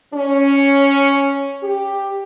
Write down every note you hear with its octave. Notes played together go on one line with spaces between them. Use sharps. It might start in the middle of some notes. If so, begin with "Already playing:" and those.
C#4
G4